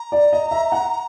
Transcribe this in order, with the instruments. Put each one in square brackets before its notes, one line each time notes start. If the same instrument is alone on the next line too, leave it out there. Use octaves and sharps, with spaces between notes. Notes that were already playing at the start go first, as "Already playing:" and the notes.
Already playing: [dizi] A#5
[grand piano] D5
D#5
E5
F#5